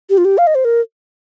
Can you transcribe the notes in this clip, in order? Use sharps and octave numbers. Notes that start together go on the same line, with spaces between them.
G4
F4
G4
F5
D#5
C5
A#4